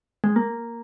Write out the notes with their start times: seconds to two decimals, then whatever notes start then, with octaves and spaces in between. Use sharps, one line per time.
0.24 G#3
0.36 A#3